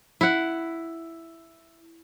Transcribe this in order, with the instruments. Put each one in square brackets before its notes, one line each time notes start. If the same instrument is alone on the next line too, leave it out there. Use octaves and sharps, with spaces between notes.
[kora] E4 F#5